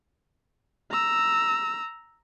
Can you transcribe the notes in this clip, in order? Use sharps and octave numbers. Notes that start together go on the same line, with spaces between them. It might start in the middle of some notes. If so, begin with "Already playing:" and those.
A#5 E6